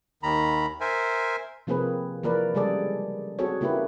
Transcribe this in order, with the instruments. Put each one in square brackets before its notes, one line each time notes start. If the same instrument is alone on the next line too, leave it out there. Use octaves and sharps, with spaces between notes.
[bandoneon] D#2 D#3 A#5 B5
A#4 C5 E5 G#5
[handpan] C3 F3 A#3 C4 G#4 B4
E3 F3 A#3 A#4 B4 D5
C#3 G3 G#3 G#4 A4 D5
C4 F#4 G#4 A4 C#5
C#3 A#3 E4 G4 B4